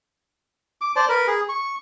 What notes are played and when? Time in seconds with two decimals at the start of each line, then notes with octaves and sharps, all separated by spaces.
0.81 D6
0.96 C5 D5 A5
1.09 A#4 B4
1.27 G#4
1.49 C#6